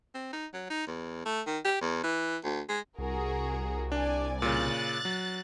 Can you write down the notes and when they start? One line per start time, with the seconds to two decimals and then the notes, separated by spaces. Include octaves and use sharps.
0.14 C4
0.33 D#4
0.54 F#3
0.70 D#4
0.87 E2
1.25 A3
1.47 D#3
1.65 G4
1.81 E2
2.03 E3
2.44 D2
2.69 G#3
2.98 C2 F#4 G#4 A#4
3.92 D4 D5 G#5
4.42 A#2 C#3 F#6 A6
5.05 F#3